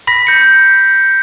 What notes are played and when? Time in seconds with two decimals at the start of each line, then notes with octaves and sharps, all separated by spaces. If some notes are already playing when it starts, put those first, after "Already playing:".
0.07 B5 A#6 B6
0.27 G6 C#7